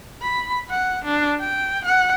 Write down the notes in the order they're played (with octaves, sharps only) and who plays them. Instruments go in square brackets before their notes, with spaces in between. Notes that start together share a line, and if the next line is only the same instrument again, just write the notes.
[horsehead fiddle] B5
F#5
D4
G5
F#5